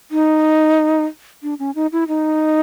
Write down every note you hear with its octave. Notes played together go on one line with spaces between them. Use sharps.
D#4
D4
C#4
D#4
E4
D#4